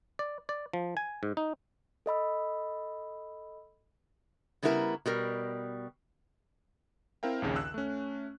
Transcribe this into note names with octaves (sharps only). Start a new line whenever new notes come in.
D5
D5
F3
G#5
G#2
D#4
A4 D#5 B5 E6
C#3 G3 B3 E4 A#4 A#5
B2 G3 A#4
C4 E4 A#4 F5 G5
A#1 D#2 C#3
E6 F#6
A3 C#4